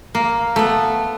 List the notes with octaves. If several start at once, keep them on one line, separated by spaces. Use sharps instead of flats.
A#3
A3 B3